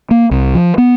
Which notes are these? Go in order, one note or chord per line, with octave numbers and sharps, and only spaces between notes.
A#3
C2
F3
B3